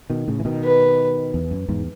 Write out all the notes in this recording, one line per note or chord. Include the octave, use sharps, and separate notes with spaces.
B2 D#3
A2 C#3
E3
B2 D#3
B4
E2
F#2
E2 G#2